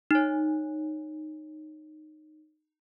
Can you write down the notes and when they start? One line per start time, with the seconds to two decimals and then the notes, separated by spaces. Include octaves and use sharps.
0.11 D#4 C#5